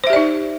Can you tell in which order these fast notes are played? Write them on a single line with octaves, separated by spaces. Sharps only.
C5 E5 G4 D5 D#4